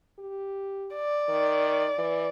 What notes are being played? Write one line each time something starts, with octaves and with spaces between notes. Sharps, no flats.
G4
D5
D#3
E3